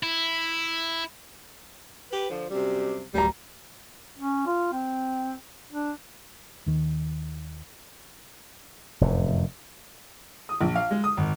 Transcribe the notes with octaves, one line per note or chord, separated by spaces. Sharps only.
E4
G4 B4
D3 F3
F#2 C3 G3
D1 G3 A#5
C#4
F4
C4
D4
D#2 D#3
F1 F#2 A2
D#6
A#1
F5
G#3
D#6
G#1